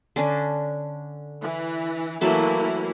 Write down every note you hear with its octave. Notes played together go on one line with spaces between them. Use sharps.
D3 C#4 D4
E3
E3 F#3 A3 A#3 E4 B4